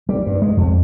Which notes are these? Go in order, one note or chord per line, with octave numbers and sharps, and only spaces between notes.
G3
G2
G#3
F2